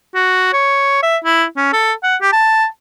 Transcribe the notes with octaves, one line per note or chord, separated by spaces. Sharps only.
F#4
C#5
E5
E4
C#4
A4
F#5
G4
A5